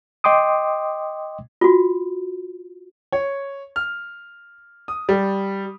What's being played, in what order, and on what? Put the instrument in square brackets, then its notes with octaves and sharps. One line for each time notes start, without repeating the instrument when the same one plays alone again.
[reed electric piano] D#5 G5 C6 D6 D#6
[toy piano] F4 F#4
[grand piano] C#5
F6
D#6
G3